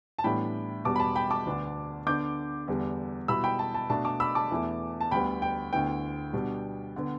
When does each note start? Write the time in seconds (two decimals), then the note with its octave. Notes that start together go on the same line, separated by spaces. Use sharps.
0.18 A5
0.24 A2 E3 G3 B3 D4 G5 B5
0.85 E2 B2 G3 A5 D6
0.96 B5
1.00 A5
1.16 G5 B5
1.30 A5 D6
1.46 D2 D3 B3 D4
2.06 D3 B3 D4 D6 G6
2.68 E2 D3 G3 D4
3.28 B2 G3 E4 B5 E6
3.44 G5 B5
3.59 A5
3.74 A5
3.89 B2 A3 D4 A5
4.05 A5 D6
4.20 B5 E6
4.35 A5 D6
4.51 E2 E3 A3
5.01 A5
5.11 D2 D3 G3 B3 G5 B5
5.42 G5
5.72 D2 D3 B3 E4 G5
6.33 B2 G3 B3 D4
6.96 D3 B3